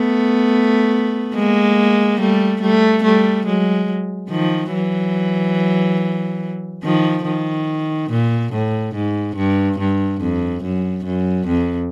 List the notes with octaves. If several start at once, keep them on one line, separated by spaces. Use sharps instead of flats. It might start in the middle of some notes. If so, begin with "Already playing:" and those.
Already playing: A3 B3
G#3 A#3
G3 A3
G3 A3
G3 A3
F#3 G#3
D#3 F3
E3 F#3
D#3 F3
D#3
A#2
A2
G#2
G2
G2
F2
F#2
F#2
F2